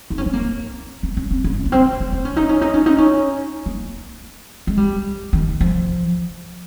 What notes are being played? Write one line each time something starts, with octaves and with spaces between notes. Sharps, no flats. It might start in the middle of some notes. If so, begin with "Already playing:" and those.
D#4
C#4
C4
A#3
C#4
C#4
C4
C#4
A#3
C4
C#4
D#4
C#4
D#4
C#4
D#4
C#4
D#4
C#4
A#3
G#3
G3
D#3
F3